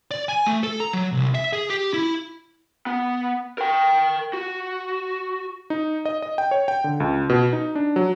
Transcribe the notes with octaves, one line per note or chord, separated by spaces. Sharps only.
D5
G#5
A3
A4
A#5
F#3
C2
E5
G#4
G4
E4
B3
A#4 G5
F#4
D#4
D#5
D#5
G5
C#5
G5
D3
C#2
B2
D#4
D4
F#3